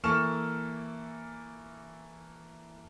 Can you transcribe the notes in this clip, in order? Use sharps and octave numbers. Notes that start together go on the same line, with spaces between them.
E3 A#3 A4 C#6 F6 E7